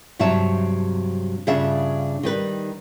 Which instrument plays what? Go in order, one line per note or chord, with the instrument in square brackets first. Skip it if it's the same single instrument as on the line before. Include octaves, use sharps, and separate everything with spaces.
[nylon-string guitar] G2 C3 F#3 C#5 E5 A5
G2 C#3 D4 F4 E5
D#3 G3 B4